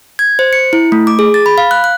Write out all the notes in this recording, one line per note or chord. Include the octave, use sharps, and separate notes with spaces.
G#6
C5
C#7
E4
A3
D6
G#4
A6
B5
F5
F#6
F#6